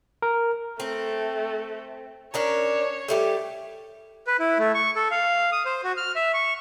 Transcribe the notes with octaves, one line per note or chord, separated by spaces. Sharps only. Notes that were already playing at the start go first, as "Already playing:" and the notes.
A#4
A3 C4
C#4 D4 A#4 C#5
G3 A3 G4
B4
E4
A3
C#6
A4
F5
D#6
C5
F#4
F6
E5
C#6